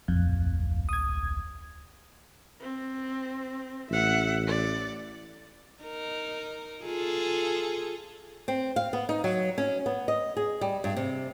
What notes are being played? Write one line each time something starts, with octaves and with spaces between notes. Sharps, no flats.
D1 A#1 F2
D#6 G#6
C4
A1 E5 F#5
D5
D#4 A#4
F4 G#4 A4
C4
F5
B3
D#4
F#3
C#4
B3
D#5
G#4
G3
G2
C3